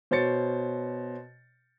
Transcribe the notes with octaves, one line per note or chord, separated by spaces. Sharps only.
B2 C5 C#5 A6 C#7